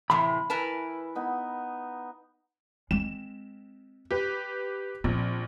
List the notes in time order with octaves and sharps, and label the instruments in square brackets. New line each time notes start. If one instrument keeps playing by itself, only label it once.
[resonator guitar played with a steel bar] A2 C3 E3 [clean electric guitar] B5
[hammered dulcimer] E3 E4 [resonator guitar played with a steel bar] A#4 B4 A5
[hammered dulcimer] B3 D#4
[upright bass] G#3 C4 [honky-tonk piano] E7
[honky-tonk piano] G4 B4
[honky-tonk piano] A#1 [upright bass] F3 C4